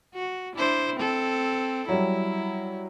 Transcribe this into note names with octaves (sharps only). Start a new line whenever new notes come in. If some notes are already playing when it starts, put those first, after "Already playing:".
F#4
D4 E4 C5
C4 A4
F#3 G3 E4